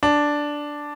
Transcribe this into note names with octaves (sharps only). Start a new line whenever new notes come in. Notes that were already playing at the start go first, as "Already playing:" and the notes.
D4